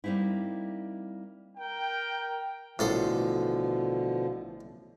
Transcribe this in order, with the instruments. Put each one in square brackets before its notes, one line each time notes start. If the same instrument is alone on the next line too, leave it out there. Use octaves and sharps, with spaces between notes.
[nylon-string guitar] G3 A#3 C4 D#4 E4
[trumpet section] A#4 G5
[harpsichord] A1 A4 C5 [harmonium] B2 D3 F3